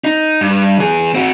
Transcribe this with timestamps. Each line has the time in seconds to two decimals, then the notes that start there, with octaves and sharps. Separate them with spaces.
0.05 D#4
0.41 G2
0.79 E2 G#4
1.15 C4 F#4